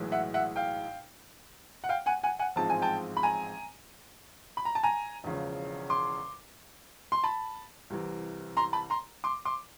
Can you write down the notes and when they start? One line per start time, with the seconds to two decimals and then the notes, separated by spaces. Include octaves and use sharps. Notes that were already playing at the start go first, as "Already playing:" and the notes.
Already playing: B1 A2 E3 G#3
0.12 E5 F#5
0.34 E5 F#5
0.56 F5 G5
1.84 F#5
1.89 F5 G5
2.06 F#5 G#5
2.23 F#5 G#5
2.39 F#5 G#5
2.56 A1 G#2 F3 G#3 C4 A5
2.70 G#5
2.82 G5 A5
3.17 B5
3.23 G#5 A#5
4.57 B5
4.65 A#5
4.75 A5
4.83 G#5 A#5
5.24 E1 E2 C#3 F3
5.90 C6 D6
7.12 C6
7.24 A5 B5
7.90 C2 C3 E3
8.57 A#5 C6
8.73 A5 B5
8.90 A#5 C6
9.24 C6 D6
9.45 C6 D6